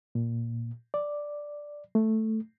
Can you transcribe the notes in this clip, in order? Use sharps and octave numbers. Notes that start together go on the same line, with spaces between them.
A#2
D5
A3